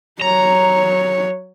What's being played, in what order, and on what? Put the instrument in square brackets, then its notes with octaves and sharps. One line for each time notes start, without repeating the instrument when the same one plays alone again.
[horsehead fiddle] F#3 C#5 [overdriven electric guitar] A#5